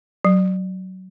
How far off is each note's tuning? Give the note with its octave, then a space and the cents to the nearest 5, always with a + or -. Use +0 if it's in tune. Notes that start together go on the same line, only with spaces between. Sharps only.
F#3 +15